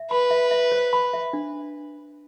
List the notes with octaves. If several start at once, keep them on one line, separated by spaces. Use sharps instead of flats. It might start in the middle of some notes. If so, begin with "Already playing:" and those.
Already playing: E5
B4 B5
E5
E5
C5
B5
E5
D4